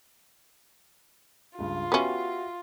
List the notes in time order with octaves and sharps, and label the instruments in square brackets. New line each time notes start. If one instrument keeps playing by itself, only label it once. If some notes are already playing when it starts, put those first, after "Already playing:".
[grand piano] C#2 G2 [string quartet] F4
[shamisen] B3 C#4 [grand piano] F#4 G4 E5